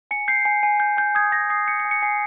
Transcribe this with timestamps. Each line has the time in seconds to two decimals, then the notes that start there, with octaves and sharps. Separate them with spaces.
0.11 G#5 C#7
0.28 G6 C7
0.45 G#5
0.63 G#5
0.80 G6
0.97 G#5 G6
1.15 D#6 G#6
1.32 G#5 A#6
1.50 D#6 C7
1.67 G6 C#7
1.80 C#7
1.85 G#5
1.91 C#7
2.02 G#5 C7